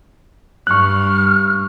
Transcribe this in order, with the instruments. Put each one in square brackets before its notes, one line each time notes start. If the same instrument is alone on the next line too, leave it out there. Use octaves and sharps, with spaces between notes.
[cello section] G2 [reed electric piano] C#6 F#6 [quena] F6